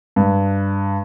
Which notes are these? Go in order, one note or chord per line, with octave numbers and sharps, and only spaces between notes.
G2